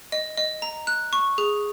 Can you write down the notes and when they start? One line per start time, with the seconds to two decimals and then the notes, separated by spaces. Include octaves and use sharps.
0.12 D#5
0.38 D#5
0.62 A#5
0.87 F#6
1.13 C#6
1.38 G#4